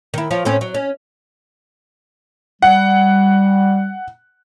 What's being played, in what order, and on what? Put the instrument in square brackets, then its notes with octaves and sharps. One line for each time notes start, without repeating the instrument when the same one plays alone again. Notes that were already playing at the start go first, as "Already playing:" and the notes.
[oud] D#3 E4
F3 F4 C#5
A2 C4 C#4
F#3
C#4
[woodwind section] G3 [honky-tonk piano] F#5